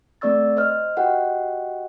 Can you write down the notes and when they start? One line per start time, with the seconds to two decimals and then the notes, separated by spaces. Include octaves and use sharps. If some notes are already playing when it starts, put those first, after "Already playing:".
0.21 A3 C4 D5 C#6 E6 A6
0.57 C5 D#5 F6
0.97 F#4 G4 B4 D#5 F#5 G5